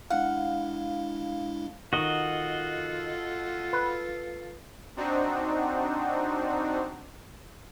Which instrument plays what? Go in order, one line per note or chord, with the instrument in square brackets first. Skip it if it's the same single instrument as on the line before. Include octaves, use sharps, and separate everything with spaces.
[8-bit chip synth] G#3 D4 E4 [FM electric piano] F5 [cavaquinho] F#5
[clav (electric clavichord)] D#3 [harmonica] F4 A4 [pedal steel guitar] F#4 D#5
[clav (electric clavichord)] B4
[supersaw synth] C4 D4 D#4 F#4